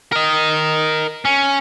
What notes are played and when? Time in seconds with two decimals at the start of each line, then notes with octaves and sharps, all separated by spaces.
0.12 A#4 D#5
1.25 C#4